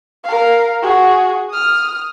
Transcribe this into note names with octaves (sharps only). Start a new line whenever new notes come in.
A#4 F5
F#4 G#4
D#6 F6